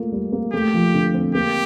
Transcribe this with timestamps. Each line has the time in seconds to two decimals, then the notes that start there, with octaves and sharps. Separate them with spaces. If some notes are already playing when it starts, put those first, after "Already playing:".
Already playing: A3 A#3 F4
0.12 G3
0.32 A#3
0.53 A3 G4
0.74 F3
0.94 D3
1.14 C4
1.35 A#3 G4